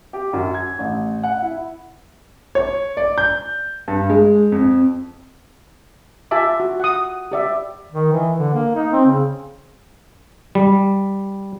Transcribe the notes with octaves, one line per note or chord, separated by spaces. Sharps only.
G4
F#2
G#6
A1
F#5
E4
C#5
D5
G6
G2
G#3
F2
F4 G4 E5 G#5 A5 D6
F#4
F#5 D#6
G4 D5 E5
D#3
E3
D3
A#3
D#4
C4
C#3
G3